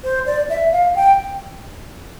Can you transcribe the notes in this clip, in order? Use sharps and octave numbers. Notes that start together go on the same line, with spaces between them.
C5
D5
E5
F5
G5